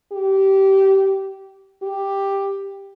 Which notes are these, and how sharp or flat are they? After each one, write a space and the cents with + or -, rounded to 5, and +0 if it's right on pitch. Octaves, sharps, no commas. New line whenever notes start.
G4 -20
G4 +5